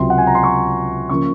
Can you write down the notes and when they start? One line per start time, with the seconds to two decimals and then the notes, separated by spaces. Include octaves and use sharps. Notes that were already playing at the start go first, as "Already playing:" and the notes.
Already playing: C#2 C3 F#3 C6
0.10 F#5
0.18 G#5
0.27 A#5
0.35 C6
0.43 C#6
1.09 C#3 F3 A#3 C#4 C#6